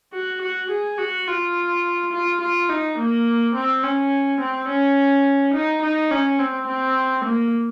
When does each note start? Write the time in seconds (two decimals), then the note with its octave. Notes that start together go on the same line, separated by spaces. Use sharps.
0.13 F#4
0.42 F#4
0.70 G#4
0.98 F#4
1.27 F4
2.13 F4
2.41 F4
2.69 D#4
2.98 A#3
3.54 C4
3.83 C#4
4.40 C4
4.69 C#4
5.54 D#4
5.82 D#4
6.11 C#4
6.39 C4
6.67 C4
7.25 A#3